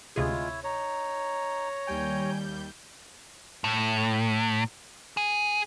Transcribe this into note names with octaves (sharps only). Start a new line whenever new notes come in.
D2 C3 G#3 E4 F4 G#4 C#5
D#4 C#5 A#5
D#2 G3 G5 G#5 G6
A2
G#4